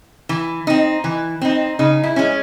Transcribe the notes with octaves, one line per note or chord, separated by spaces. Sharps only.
E3
C4 D#4
E3
C4 D#4
C#3 D#4
E4
G#3 C#4